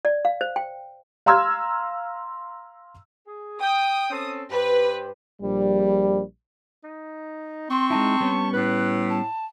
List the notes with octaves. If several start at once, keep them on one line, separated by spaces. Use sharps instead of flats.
D5
F5
C5
G5
F5 A#5 C6 E6 F6 G#6
G#4
G5 D#6
C4 C#4 A4
G2 G4 B4 C5
A#1 G3
D#4
C4 C6 C#6
G#3 D#4 E4 A5
G3 B3 C#4
A2 B4 F#6
A5